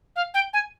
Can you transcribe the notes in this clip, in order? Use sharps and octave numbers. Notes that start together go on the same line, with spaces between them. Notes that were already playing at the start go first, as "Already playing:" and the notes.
F5
G5
G#5